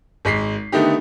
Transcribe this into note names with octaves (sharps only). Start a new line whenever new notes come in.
G#1 G#3 B6 C7
D3 D#3 A3 B3 D#4 G4